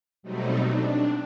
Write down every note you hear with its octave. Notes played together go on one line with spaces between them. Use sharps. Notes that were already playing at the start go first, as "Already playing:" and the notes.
B2 F#3 G3 A3 C4 D#4
D4